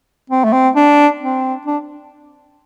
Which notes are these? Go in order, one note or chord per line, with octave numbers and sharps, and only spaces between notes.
C4
A3
C4
D4
C4
D4